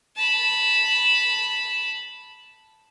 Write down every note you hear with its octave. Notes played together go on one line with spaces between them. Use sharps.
A5 B5